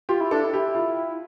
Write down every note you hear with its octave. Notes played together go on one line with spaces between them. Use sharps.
F4 G4
E4
D4 A4
E4
G4
F4